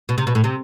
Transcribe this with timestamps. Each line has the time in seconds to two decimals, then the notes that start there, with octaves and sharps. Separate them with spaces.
0.09 B2
0.18 C3
0.27 B2
0.35 A2
0.44 C3